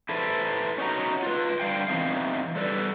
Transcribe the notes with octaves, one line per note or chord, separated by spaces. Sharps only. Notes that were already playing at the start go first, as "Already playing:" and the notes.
E4 A4 B4 C5
C#4 D#4 F#4 A#5
F4 B4
D3 G3 F5 G5
E2 E3 C4 D#4 F5
G3 A4 B4 D5